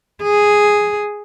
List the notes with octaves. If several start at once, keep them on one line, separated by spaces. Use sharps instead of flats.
G#4